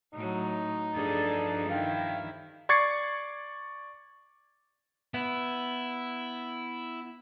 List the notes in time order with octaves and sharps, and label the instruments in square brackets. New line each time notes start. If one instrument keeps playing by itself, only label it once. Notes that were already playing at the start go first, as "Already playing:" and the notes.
[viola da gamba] A2 F#3 [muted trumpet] D#4
[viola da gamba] G2 F3 G3 [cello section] D4 G#4 A4
[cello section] D#3 E4 [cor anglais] F5 [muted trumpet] G5
[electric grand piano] D5 C#6 G#6 A6 C7 C#7
[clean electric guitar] B3 [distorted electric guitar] E4